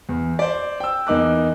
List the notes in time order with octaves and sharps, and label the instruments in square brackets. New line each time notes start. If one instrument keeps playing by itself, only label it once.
[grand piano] E2
C5 D5
G5 E6
E2 A#3 D#4 D6 F#6